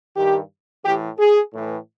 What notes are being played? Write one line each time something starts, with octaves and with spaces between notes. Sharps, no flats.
G2 D#3 G4
A2 E3 G4
G#4
A2 E3